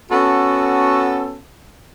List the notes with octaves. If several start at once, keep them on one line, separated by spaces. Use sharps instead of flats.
B3 C#4 F#4 A4